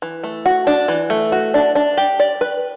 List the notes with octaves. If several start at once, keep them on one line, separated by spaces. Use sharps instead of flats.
E3
A3
F#4
D4
E3
A3
F#4
D4
D4
G4
D5
B4